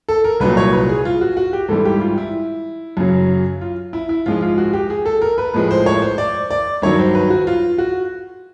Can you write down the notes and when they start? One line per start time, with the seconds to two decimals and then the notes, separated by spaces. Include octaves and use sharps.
0.08 A4
0.24 A#4
0.40 C2 A#2 F#3 B4
0.57 C#5
0.73 B4
0.89 G#4
1.05 F4
1.21 F#4
1.37 F#4
1.53 G4
1.68 G#2 E3 G3 A4
1.85 G4
2.01 F4
2.18 E4
2.97 F#2 C#3 F#3
3.61 F4
3.93 E4
4.09 E4
4.26 G#2 F3 G#3 F4
4.42 F4
4.58 F#4
4.73 G4
4.90 G#4
5.05 A4
5.22 A#4
5.38 B4
5.54 A2 F3 G#3 B4
5.71 C5
5.86 C#5
6.02 C5
6.18 D5
6.51 D5
6.82 G2 D#3 F#3 C#5
6.99 C5
7.15 B4
7.30 F#4
7.47 F4
7.78 F#4